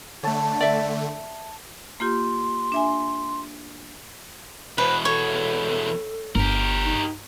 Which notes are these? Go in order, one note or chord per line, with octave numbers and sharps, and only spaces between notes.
D3 A3 C#5 A5
D5 E5
A#3 F4 G4 C6
D4 E5 G#5
E2 B2 B4 C5
A4 C#5
G1 G4 A#4
D#4